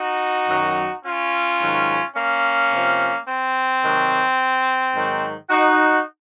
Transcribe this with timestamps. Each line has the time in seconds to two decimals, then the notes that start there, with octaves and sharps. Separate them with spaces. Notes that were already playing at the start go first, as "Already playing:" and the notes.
Already playing: D#4 F#4
0.48 F#2 D#3 F#3
1.03 C#4 F4
1.60 G#2 D#3 F#3
2.15 A#3 C#4
2.71 C3 F3
3.26 C4
3.82 C3 D#3 F#3
4.94 G#2 D#3 F#3
5.50 D#4 F#4